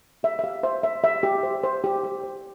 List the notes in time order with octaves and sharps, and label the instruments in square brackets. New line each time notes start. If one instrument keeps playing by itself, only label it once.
[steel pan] G4 E5
E5
G4 F5
C5 E5
C5 E5
G4 E5
G4
C5
C5
G4
G4
C5